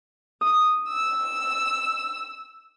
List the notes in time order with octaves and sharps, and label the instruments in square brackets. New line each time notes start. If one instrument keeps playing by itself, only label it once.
[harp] D#6
[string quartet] E6